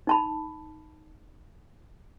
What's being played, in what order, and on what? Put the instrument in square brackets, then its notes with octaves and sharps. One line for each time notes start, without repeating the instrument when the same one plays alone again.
[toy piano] D#4 A5 B5